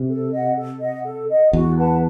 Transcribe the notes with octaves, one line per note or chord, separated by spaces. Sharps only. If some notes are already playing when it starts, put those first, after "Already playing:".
Already playing: C3
A4
D#5 F#5
A4
D#5 F#5
A4
D#5 F#5
E2 F#4
B4 F#5 A5